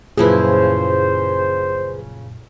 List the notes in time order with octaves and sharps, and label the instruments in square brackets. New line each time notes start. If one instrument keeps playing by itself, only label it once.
[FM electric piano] F#2 A#2 [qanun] C#3 F3 E4 [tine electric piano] G#4 B4 [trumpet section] C5